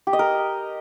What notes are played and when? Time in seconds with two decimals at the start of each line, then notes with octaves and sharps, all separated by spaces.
0.07 G4
0.13 D#5
0.19 A#4